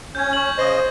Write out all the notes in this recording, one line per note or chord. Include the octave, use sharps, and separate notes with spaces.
C#4 G6 G#6
C#6 F#7
C#3 C5 D#5